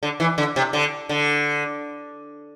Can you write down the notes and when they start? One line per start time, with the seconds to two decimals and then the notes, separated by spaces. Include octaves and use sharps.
0.03 D3
0.20 E3
0.38 D3
0.56 C3
0.73 D3
1.09 D3